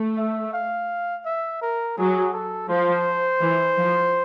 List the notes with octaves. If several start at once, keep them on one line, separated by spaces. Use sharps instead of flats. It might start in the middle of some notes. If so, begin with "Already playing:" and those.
Already playing: A3
E5
F5
E5
A#4
F#3 G#4
A4
F3 C5
E3
F3